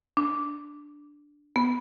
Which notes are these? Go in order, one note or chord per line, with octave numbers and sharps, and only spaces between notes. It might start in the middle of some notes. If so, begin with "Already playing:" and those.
D4
B3